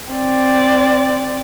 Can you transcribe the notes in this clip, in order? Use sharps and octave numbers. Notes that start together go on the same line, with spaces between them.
C4 D5